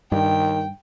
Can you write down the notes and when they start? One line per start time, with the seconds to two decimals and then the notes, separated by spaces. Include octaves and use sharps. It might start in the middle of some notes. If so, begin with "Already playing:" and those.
0.12 G2 D#3 G5